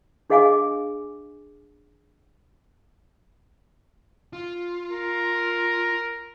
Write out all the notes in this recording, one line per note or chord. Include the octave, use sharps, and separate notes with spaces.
D4 G#4 D#5 F5 G#5 D6
F4
A#4